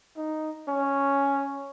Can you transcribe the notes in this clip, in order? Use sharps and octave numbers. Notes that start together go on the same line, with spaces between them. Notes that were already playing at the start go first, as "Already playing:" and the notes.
D#4
C#4